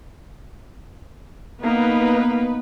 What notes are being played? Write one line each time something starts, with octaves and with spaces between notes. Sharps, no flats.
A#3 B3 D#4 B4